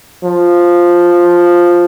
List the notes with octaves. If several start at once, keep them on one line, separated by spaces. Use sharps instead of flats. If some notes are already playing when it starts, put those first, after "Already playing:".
F3